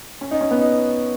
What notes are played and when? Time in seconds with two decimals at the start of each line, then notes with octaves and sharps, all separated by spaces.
0.21 C#4
0.31 D#4
0.41 C#4
0.51 B3
0.61 D#4